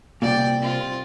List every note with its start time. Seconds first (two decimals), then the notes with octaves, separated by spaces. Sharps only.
0.22 C2 A#2 D5 G5
0.59 C4 F4